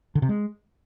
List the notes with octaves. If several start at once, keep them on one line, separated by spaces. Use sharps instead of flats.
D3
C3
G#3